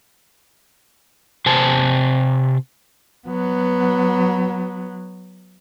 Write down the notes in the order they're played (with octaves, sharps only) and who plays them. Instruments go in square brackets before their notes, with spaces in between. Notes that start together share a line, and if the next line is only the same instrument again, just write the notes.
[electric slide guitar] C3 C5 G#5 A5
[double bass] F#3 B3